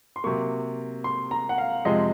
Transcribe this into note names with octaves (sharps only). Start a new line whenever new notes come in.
C6
C3 F#3 A#3 C#6
C6
A#5
F#5
F5
F2 C3 F3 G#3 D#5